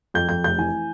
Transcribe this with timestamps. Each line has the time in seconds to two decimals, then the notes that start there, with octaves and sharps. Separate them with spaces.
0.14 F2 G6
0.29 F2 G6
0.44 F1 G6
0.58 E3 G#5